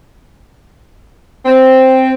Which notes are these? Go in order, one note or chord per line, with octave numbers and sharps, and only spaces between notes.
C4